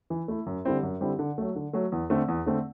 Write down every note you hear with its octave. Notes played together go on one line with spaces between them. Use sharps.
E3
A3 E4
F#2
D3 G3 C4 E4
F#2
D3 G3 C4 E4
D3
F#3 A3
D3
F#3 A3
E2
D3 A3 C4
E2
D3 A3 C4